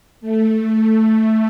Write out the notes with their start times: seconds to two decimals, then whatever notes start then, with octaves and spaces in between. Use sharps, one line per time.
0.21 A3